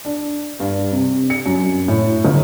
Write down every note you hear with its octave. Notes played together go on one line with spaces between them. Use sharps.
D4
G2
C3
C#7
F#2
A2
G1